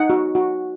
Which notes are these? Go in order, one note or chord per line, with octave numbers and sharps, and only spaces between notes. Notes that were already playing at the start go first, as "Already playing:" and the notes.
Already playing: D#4 F#5
F#4
F#4